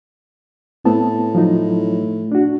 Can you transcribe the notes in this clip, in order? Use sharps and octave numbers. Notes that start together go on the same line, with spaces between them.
A2 B3 C4 A5
F3 F#3 D#4
D4 F#4